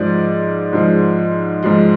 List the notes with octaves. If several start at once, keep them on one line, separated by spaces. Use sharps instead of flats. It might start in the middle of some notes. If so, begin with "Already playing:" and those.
Already playing: G#2 F3 G#3 D5
G#2 F3 G#3
G#2 F3 G#3